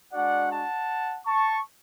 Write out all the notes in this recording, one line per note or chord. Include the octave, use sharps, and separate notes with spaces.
G#3 D4 F#4 D5 F#5
F#5 A5
A5 C#6